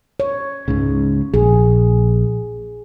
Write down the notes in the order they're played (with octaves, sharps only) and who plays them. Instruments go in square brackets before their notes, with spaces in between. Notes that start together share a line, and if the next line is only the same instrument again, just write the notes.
[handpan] C#5
[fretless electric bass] C#2 G#2 C#3
[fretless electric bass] A#1 [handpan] G#4